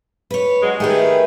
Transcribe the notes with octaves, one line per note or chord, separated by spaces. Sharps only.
B4 C#5
G2 F#3 G#3
D#3 A3 G4 G#4 B4